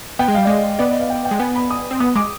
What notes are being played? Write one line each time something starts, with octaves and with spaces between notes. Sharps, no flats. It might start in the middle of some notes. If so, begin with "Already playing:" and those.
B3 G5
G#3
G3 F5
G#3 D5 D#5
B3 D5
D#5
F5
G5
G5
G#3
B3 G#5
B5
D#6
C4
B3 D#6
G#3 D6